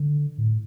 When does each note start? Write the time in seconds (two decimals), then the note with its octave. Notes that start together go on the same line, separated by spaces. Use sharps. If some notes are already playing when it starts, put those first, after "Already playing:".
Already playing: D3
0.38 A2